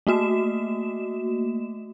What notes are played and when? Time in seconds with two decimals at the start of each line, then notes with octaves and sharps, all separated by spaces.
0.07 A3 A#3 F#4 E7